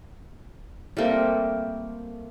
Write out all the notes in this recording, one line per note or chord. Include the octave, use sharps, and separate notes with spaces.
G3 A3 A#3 C4